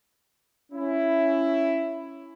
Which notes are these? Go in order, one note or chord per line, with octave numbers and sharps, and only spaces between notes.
C#4 E4